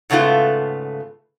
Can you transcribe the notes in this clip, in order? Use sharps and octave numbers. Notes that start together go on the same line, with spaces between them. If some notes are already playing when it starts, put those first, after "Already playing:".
G#2 C#3 A3 B3 F4